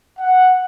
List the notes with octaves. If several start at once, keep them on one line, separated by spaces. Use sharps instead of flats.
F#5